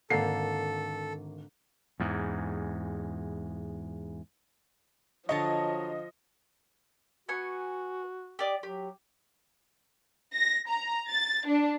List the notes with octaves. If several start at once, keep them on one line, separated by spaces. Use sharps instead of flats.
G#1 D3 A#3 A4 C7
E2 G#2
D3 F3 F#3 C#5 D#5 A5 C#7
B3 F#4 G#5 C#6
G4 D5 D#5
F#3 G4
A#6
A#5
A6
D4